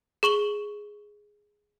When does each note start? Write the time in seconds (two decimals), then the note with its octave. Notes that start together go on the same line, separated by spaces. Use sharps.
0.23 G#4 C#6 F#7 G7